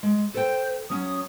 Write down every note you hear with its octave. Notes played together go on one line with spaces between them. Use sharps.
G#3
A4 C5 G5
F#3 C#4 D#6